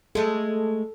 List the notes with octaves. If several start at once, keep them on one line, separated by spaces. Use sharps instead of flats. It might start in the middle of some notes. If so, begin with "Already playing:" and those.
G#3 A3 A4